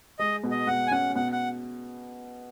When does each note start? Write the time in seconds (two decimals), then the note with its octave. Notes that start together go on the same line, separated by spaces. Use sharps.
0.19 G#3 D#5
0.44 B2
0.51 D#5
0.67 B2 F#5
0.87 G#5
0.91 C#4 F#5
1.16 B2 F#5
1.32 F#5